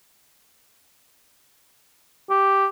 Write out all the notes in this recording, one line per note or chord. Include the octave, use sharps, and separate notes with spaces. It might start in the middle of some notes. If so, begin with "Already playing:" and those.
G4